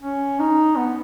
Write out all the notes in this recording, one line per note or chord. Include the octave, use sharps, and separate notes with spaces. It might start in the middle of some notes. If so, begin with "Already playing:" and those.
C#4
D#4
B3